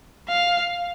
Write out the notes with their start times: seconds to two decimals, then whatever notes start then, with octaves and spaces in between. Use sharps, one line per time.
0.28 F5